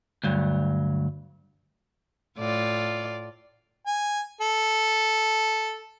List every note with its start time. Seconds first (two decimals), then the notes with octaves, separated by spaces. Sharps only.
0.24 D2 G2 F#3
2.39 A2 F4 D5
3.87 G#5
4.41 A4